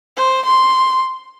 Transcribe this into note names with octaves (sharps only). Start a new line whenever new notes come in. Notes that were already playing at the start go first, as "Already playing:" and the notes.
C5
C6